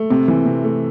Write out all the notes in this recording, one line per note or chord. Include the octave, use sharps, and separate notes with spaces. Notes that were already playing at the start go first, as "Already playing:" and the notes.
Already playing: A3
C3
E3
C3
A3